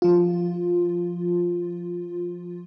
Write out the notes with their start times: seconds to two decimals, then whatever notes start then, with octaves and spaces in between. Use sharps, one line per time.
0.02 F3 F4